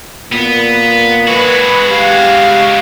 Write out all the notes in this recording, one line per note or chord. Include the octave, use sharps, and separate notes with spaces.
A#2 B3
G#3 F#4 B4
G4 F5